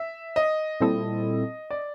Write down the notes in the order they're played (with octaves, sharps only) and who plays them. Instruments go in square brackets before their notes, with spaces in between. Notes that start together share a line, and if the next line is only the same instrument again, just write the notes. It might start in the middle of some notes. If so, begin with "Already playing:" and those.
Already playing: [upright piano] E5
D#5
[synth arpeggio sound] A#2 G3 C4 E4 A4
[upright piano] D5